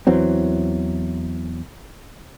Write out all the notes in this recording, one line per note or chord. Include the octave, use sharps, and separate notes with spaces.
E2 E3 F#3 C4